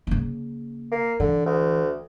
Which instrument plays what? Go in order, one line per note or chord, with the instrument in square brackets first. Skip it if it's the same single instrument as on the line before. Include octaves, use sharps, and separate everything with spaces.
[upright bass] C#3 A#3
[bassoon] A#3
[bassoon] D3 [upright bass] E3
[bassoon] D2